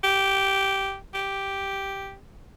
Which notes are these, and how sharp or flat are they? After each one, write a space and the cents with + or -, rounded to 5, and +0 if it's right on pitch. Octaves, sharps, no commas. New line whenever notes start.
G4 -10
G4 +0